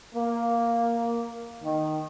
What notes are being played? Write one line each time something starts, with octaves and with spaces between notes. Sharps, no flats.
A#3
D#3